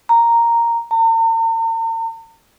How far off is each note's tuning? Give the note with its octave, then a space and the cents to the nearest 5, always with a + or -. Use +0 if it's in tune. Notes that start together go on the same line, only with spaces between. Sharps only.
A#5 -5
A#5 -45